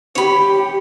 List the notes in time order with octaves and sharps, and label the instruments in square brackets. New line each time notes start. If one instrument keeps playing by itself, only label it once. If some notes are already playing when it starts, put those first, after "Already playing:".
[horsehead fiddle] G4 [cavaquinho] C#5 B5